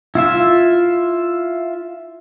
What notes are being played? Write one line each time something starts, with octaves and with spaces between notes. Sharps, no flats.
E4 F4 E5